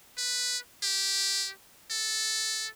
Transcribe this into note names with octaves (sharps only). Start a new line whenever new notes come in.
B4
G4
A4